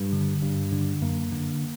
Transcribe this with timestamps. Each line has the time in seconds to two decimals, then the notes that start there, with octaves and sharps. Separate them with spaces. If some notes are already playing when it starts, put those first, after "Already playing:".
Already playing: G2 G3
0.12 D3
0.42 G2
0.72 D3
1.02 F#2 A#3
1.32 D3